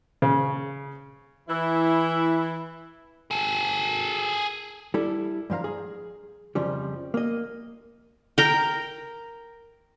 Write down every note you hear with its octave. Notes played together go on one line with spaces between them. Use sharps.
C#3
E3 E4
G#4 A4
G3 E4 A4
G2 F3 F5 A#5
G#4
F2 C#3 F3 G3
A#3 D#5
A#4 G5